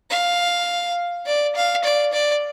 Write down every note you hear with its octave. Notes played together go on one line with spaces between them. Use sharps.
F5
D5
F5
D5
D5